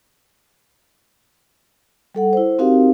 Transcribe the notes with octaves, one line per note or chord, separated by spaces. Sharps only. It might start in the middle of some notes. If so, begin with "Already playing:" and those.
G3 A4 F#5
E4 C5
C4 D#4 F#4 G4 A#4 F5